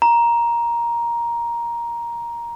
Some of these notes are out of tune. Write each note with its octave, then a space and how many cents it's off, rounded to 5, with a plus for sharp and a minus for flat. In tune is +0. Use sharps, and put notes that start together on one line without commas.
A#5 +10